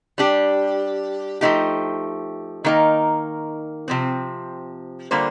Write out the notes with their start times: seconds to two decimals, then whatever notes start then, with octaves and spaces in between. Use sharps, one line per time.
0.18 G3 D4 G4
1.41 F3 A3 D#4 G4
2.64 D#3 A#3 D#4 A#4
3.88 C3 F3 C4
5.11 D3 G3 A#3 F4 C5